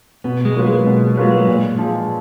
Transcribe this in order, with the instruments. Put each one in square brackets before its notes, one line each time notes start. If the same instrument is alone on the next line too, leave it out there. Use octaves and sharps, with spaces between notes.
[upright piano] B2 [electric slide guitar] B3
[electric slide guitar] G#3
[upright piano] F#3 A#3 F4 B4
[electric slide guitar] G#3
[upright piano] B2
F#3 A#3 F4 B4
A#2
F3 G#3